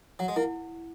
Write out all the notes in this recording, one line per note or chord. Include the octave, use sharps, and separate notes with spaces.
F#3 F#5
G#3
A#3 E4